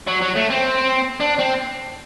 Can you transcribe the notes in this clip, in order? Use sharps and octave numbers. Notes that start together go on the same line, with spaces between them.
F#3
F#3
A3
C4
D4
C4